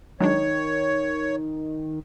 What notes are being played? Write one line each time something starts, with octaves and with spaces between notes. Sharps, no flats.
D#3 F#3 G#3 D4 C#5